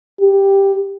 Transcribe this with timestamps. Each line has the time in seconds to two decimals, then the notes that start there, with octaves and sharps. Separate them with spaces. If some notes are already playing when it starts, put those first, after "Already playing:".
0.21 G4